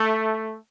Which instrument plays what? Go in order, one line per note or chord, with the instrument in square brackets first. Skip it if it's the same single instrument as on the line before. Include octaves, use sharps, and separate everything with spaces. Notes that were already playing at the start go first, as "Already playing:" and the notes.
Already playing: [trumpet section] A3